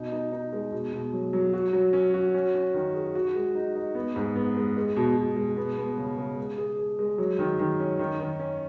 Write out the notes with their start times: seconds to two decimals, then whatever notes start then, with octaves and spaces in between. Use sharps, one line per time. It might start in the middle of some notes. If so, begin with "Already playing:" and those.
Already playing: B2 D#4
0.12 D#4
0.32 D#4
0.53 G#3
0.72 B2
0.93 B2
1.13 F#3
1.33 F#3
1.53 F#4
1.73 F#3
1.93 C#4
2.14 F#4
2.34 C#4
2.55 C#4
2.74 D#3
2.94 G#4
3.15 F#4
3.35 G#3
3.55 D#4
3.75 D#4
3.95 B3
4.16 G#2
4.36 B3
4.56 G#3
4.76 G#3
4.96 B2
5.16 B2
5.36 G#3
5.57 B3
5.77 B3
5.98 C#3
6.18 C#3
6.38 G#3
6.58 G#4
6.78 G#4
6.99 G#3
7.18 F#3
7.39 D#3
7.59 D#3
7.80 C#4
7.99 D#3
8.20 D#3
8.39 C#4